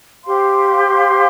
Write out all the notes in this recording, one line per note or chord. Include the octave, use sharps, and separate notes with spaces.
G4 C5 F5 C6